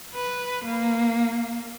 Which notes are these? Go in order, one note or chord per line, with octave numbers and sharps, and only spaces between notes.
B4
A#3